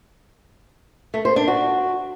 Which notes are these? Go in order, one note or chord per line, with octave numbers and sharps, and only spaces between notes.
A3
C5
D4
F#4